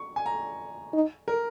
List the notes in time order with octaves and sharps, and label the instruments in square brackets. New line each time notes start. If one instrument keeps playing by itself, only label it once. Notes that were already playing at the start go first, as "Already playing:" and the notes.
Already playing: [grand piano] C#6
G#5
A#5
[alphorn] D#4
[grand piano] A#4